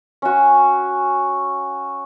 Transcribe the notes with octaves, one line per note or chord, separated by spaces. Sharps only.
C#4 F#4